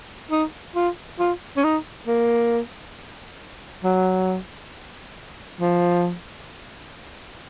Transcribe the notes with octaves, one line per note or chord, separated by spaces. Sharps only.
D#4
F4
F4
C#4
D#4
A#3
F#3
F3